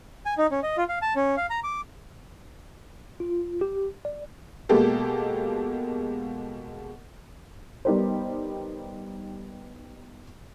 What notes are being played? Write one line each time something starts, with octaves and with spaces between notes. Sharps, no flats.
G#5
D#4
C#4
D#5
F4
F5
A5
C#4
F5
A#5
D6
F4
G4
D5
B2 G#3 A#3 G4 A4
G3 B3 D#4 G4 A#4 C5